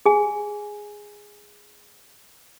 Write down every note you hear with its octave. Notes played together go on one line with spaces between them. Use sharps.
G#4 G#5